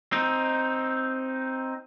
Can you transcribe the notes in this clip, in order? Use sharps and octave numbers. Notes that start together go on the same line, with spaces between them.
C4 D#4